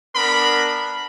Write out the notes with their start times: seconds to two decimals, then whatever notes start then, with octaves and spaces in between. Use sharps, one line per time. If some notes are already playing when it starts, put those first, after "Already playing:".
0.16 B3 D4 A#4 B5